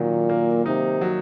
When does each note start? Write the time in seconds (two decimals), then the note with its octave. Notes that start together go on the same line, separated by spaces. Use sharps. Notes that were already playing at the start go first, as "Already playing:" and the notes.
Already playing: A#2 D#3 F#3
0.29 A#3
0.65 C3 D#4
1.01 F#3